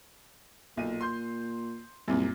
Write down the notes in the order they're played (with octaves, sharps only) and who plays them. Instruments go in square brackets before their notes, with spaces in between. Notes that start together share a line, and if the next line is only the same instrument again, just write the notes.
[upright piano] B1 D#7 [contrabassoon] A#2
[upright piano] C6 G6
[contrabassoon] C2 [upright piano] F#2 A#2